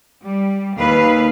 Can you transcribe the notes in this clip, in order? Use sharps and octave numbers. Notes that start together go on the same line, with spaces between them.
G3
D#2 B4 F5